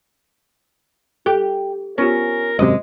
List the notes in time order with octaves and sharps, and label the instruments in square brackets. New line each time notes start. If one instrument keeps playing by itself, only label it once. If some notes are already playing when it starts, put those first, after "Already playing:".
[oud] G4 [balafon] A4
[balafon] B3 F4 G4 [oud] C#4 [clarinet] A#4
[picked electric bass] G#1 F#2 C3 [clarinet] G#3 [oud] D#5